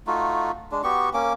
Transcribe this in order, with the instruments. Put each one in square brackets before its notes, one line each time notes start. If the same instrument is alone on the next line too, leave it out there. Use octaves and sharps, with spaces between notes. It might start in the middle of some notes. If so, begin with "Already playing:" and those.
[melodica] A3 D#4 F4 F#4
G#3 D4
B3 F#4 G4 C#6
A#3 C#4 D6